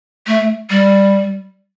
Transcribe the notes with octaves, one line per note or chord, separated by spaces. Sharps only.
A3
G3